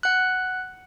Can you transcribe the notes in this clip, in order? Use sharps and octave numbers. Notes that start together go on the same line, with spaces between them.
F#5 F#6